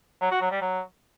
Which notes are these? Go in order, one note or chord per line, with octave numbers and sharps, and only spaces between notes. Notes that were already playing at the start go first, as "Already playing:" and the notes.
F#3
F#4
F#3
G3
F#3